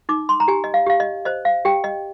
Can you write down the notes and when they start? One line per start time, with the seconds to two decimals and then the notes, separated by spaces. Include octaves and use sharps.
0.09 D#4 D6
0.29 C6
0.40 A#5
0.48 G4 G#5
0.64 D#5
0.74 F5
0.86 G4 F5
1.00 D#5
1.25 C5 D#5
1.45 F5
1.65 G4 G5
1.84 D#5